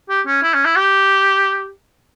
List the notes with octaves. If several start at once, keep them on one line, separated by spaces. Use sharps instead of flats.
G4
C#4
E4
C#4
E4
G4